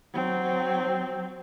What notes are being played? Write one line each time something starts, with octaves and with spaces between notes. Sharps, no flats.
F#3 C4